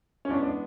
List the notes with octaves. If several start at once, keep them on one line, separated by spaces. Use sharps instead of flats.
C#4
E3 G#3 B3 D4
D4